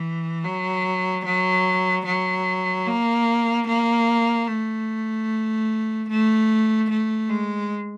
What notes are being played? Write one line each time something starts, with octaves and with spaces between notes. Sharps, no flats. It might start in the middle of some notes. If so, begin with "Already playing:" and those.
Already playing: E3
F#3
F#3
F#3
A#3
A#3
A3
A3
A3
G#3